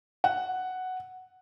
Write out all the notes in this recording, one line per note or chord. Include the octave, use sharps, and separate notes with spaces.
F#5